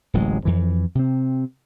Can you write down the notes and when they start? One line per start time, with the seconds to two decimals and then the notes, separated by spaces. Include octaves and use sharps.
0.14 D1 A1 F#3 G#3
0.45 F2 E3
0.95 C3 C4